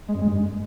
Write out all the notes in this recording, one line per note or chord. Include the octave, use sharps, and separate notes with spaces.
G#3
F#2
G#3
G2